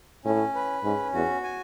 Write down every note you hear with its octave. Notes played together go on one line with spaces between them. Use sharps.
A2 C#4
B4
G#2 C#4
E2 F#4
G#5